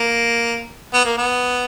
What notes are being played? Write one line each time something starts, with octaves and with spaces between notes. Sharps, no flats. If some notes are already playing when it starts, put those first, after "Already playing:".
Already playing: A#3
B3
A#3
B3